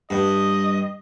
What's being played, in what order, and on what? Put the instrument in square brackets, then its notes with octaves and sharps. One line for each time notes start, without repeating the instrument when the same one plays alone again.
[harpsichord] G2 [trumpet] D#5